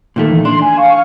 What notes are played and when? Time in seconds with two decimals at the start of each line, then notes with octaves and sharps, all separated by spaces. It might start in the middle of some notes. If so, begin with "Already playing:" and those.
0.16 A#2 D#3 A3
0.31 E3
0.45 D4 C6
0.62 G#5
0.77 F5 C#6